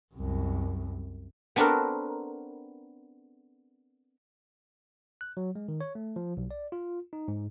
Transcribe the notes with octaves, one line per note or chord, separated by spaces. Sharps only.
C2 F#2
B3 C4 D4 F#4 A4 A#4
F#6
F#3
G#3
D#3
C#5
A3
F3
B1
D5
F4
D#4
G#2